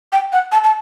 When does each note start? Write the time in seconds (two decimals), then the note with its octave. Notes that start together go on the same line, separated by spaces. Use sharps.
0.12 G5
0.33 F#5
0.52 A5
0.64 A5